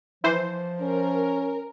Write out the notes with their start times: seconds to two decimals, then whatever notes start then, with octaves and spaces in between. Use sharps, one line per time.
0.24 E3 F3 C5
0.80 C#4 A#4